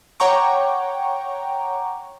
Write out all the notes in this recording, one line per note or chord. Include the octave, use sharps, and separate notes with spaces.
C#5 F#5 G5 A#5 C#6 D6